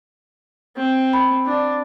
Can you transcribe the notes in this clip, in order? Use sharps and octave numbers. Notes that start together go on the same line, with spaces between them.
C4
B5
D4